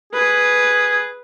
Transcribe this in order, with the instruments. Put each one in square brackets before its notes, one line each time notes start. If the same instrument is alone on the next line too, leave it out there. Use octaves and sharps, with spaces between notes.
[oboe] G#4 [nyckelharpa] B4